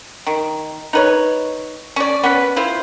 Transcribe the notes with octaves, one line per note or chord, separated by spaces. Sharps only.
D#3
D#4 B4 C#5
C#4 D5
B3 C#4 B4
E4 F4 C5